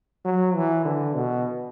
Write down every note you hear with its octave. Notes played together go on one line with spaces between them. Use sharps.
F#3
E3
D3
B2